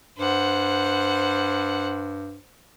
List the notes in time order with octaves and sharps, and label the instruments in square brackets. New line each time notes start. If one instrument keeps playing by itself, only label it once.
[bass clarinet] G2 [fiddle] C5 F#5